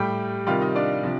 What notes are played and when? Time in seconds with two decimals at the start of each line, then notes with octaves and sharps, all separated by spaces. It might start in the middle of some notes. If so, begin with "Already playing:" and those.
Already playing: A2 G3 G4 G5
0.47 C3 D#3 G3 F4 F5
0.61 D#4 D#5
0.75 D4 D5
1.03 C3 F3